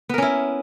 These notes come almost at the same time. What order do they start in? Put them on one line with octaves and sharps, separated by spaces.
B3 A#4 C#4 E4